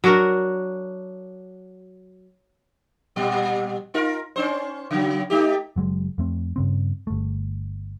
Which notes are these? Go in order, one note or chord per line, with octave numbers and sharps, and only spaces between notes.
F#3 D4 F#4 A#4
A#2 G3
D#4 F4 A#4
C#4 D4 C5
C#3 F#3
A3 D#4 G4
F#1 F#3 G#3
F2 A3 C4
G2 C#3 C4
G1 A3